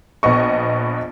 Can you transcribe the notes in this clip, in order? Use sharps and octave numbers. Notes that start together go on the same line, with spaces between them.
A#1 B3 D#5 C#6